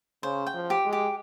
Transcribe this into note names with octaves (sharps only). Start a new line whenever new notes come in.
C#3 C5
G5
F3
G4
G#3
G4